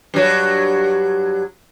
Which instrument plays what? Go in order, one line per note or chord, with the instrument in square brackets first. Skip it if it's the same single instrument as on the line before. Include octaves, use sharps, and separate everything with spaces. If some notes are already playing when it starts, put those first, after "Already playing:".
[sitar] G2 F#3